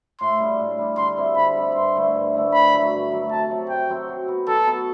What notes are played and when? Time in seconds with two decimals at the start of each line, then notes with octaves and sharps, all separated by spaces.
0.21 A2 C6
0.39 G3 D4
0.60 A2
0.78 G3 D4
0.97 D3 C6
1.17 G3 C4 E4
1.37 D3 B5
1.56 G3 C4 E4
1.75 G2 C6
1.95 D3 A3 E4
2.14 G2
2.34 D3 A3 E4
2.52 G2 B5
2.73 F#3 A3
2.92 G2
3.12 F#3 A3
3.31 C3 A5
3.50 F#3 C4 F#4
3.69 C3 G5
3.89 F#3 C4 F#4
4.09 F#3
4.28 B3 F#4
4.47 F#3 A4
4.67 B3 F#4